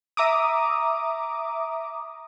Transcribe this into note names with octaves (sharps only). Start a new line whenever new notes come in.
E5 A#5 D6 D#6